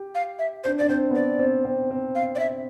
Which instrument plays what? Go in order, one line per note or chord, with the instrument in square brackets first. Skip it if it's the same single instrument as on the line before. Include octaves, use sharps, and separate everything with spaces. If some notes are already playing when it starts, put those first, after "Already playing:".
Already playing: [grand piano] G4
[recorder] F5
E5
[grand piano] D4 [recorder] C5
[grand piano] D4 [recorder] D5
[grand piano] C4 [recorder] C5
[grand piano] B3
[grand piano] C4 [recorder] D5
[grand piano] C4
C4
C4
[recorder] F5
D5
E5